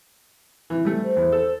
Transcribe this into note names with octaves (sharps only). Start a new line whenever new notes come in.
E3
G3 A3
C5
E2
A4